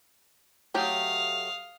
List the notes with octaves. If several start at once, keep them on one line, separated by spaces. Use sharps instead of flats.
F#3 A3 G4 F5 D#6